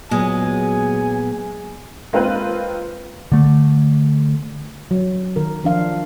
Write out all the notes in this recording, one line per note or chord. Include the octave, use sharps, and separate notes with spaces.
A#2 F#3 G#3 B3 G#5
G#3 A#3 C4 F4 B4
D3 A3
F#3
D#3 A#4
F3 D4 F5